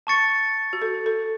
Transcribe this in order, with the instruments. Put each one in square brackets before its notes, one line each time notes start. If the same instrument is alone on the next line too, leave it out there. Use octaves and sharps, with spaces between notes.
[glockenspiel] A5 C#6 A6 C#7
[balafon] F#4
A4
A4